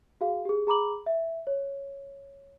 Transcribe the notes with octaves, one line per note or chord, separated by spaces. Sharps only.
F#4 G#4 F5
G4 G#4
G#4 A#5 B5 D6 F#7
E5
C#5